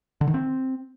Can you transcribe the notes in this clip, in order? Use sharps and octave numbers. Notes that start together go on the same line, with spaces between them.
D3
D#3
C4